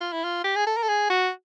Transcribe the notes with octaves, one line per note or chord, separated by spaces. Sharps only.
F4
E4
F4
G4
G#4
A4
A#4
A4
G#4
F#4